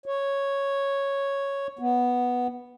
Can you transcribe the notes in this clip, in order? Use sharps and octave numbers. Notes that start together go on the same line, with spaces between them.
C#5
B3